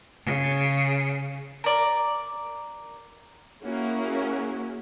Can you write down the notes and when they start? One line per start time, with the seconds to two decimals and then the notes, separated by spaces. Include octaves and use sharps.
0.24 C#3
1.64 A#4 D5
3.64 A#3 C#4 E4 F#4 G#4